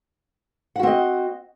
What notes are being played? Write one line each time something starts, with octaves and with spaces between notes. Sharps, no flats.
C4 F#4 D#5 F#5